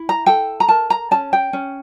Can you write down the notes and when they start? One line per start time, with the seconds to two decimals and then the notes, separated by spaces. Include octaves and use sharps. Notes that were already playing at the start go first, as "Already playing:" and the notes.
Already playing: E4
0.09 A#5
0.26 A4 G5
0.60 A#5
0.68 A#4 A5
0.90 A#5
1.11 C#4 A5
1.33 G5
1.53 C#4